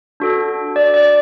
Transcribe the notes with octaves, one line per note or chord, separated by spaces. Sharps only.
D4 F#4 A4
D5
D5